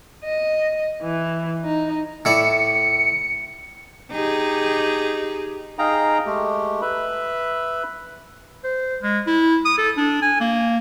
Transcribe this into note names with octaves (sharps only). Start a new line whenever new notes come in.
D#5
E3
D#4
A2 E4 D5 C#7
D#4 G4 G#4
D#4 G#4 F5 G5 A#5
G#3 A3 G4
B4 E5 B5
C5
G#3
E4
D#6
A4
D4
G#5
A#3